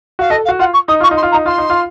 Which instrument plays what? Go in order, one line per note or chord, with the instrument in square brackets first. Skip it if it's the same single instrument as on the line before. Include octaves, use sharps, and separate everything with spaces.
[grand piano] F#4 [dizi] F5
[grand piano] A4 [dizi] D#5
[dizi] F5
[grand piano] F#4
[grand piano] F4 [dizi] F#5
[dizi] C#6
[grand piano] D#4 [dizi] D#6
[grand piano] F4 [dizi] C#6
[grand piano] D#4
[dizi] C6
[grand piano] F4
[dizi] A#5
[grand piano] D#4
[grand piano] F4 [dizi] C6
[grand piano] D#4
F4